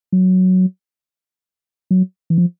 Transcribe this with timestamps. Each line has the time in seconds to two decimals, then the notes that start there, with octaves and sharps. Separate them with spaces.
0.12 F#3
1.91 F#3
2.30 E3
2.38 F3